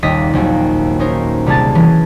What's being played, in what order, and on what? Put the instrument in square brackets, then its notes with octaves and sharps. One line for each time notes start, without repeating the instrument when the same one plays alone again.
[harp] D#1 D#2 G3 D#5 B6
A#1 D#2 F#3
C#4 D#4 A#4 C5 C#5
C2 G3 G#4 A5 A6
E3 C#4